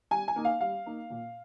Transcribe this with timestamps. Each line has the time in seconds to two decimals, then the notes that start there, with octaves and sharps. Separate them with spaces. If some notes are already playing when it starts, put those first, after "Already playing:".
0.11 G3 G#5
0.28 G#5
0.36 A#3 D#4
0.45 F5
0.61 G3 F5
0.86 A#3 D#4
1.10 A#2